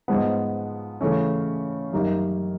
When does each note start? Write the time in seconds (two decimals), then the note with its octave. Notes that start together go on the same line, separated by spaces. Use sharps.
0.08 G#2 F3 G#3 B3
1.01 C#3 E3 A3 C#4
1.93 F#2 D#3 G3 A#3 D#4